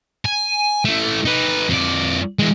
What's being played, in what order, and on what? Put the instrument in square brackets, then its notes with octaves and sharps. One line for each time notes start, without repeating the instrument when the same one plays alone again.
[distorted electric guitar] G#5
E3 A3
D#4 B4
F2 D5
E3 G#3